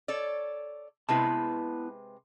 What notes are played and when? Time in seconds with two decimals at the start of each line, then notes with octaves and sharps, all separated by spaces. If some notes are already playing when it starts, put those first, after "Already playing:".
0.08 A4 C#5 D5
1.09 C3 G#3 B3 E4 B4 A5